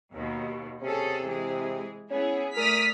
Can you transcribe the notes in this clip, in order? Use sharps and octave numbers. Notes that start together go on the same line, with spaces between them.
D#2 B2
C3 C#4 G#4 A4
E3 G#3 G#4
B3 C#4 E4 G#4
A3 A#4 D5 D#6 F6 B6